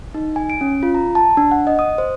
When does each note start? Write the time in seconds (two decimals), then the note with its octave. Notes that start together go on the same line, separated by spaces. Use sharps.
0.14 D#4
0.36 G#5
0.50 D7
0.61 C#4
0.83 F4
0.95 A#5
1.15 A5
1.37 D4
1.51 F#5
1.67 D#5
1.79 D#6
1.98 C5